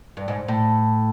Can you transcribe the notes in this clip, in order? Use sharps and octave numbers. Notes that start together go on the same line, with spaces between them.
G2
G#2
A2